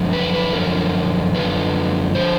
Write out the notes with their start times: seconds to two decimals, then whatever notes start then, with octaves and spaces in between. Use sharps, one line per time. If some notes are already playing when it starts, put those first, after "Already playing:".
Already playing: F#2 D3 F3
0.13 B4
0.34 B4
0.53 F#2 D3 F3 A#4
1.34 F#2 D3 F3 B4
2.15 D3 F3 C5